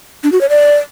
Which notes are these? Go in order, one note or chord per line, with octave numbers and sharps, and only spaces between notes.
D4
F#4
C#5
D5